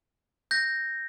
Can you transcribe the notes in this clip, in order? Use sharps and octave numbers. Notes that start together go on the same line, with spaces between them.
G6 A#6